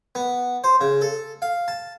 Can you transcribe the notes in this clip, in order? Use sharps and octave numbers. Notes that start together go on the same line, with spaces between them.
B3
C5
C#3
A4
F5
A5